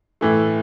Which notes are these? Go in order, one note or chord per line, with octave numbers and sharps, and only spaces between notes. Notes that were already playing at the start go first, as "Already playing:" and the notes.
A2 E3 A3